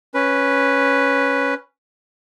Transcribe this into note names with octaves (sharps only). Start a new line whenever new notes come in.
C#4 B4